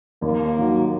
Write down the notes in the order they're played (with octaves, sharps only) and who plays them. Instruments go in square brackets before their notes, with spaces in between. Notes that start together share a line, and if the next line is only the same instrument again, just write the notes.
[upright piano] D#2 [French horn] A#3
[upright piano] D#3 F#3